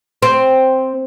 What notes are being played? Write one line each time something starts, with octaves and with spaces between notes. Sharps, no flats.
C4